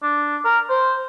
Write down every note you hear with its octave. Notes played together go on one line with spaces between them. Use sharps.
D4
A#4
C5